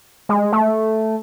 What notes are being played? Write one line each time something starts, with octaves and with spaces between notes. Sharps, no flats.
G#3
A3